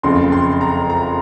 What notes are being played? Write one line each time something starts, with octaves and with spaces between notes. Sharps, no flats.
F#1 F2 C#3 C6
C6
A#5
A#5